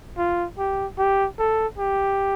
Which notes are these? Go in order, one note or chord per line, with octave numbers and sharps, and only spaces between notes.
F4
G4
G4
A4
G4